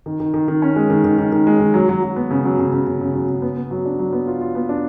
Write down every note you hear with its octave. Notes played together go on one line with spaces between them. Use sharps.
D#3
D#3
D#3
D#3
C#4
G#3
D#3
D#3
D#3
D#3
G#3
D#3
F#3
F#3
F#3
B3
C#3
F#3
C#3
C#3
C#3
C#3
F#3
C#3
B3
B3
F#3
D4
F#3
B3
F4
F4
B3
D4